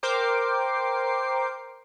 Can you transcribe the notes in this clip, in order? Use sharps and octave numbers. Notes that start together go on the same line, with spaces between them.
A#4 C5 G5 D6 C7